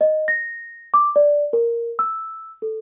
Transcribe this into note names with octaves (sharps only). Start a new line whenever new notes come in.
D#5
A#6
D6
D5
A#4
E6
A4